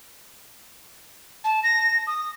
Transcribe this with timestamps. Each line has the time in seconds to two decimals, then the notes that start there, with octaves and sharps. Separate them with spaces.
1.44 A5
1.64 A#6
2.07 D#6